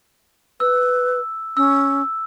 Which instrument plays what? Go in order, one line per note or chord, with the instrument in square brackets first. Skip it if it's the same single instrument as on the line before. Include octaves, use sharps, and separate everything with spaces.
[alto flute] B4 [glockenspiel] E6
[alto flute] C#4 [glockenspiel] E6